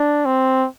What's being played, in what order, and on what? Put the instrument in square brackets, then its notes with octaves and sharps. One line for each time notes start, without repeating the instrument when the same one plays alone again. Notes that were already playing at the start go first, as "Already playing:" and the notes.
Already playing: [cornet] D4
C4